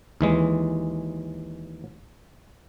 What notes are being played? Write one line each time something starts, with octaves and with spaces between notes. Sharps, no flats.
D#2 E3 G#3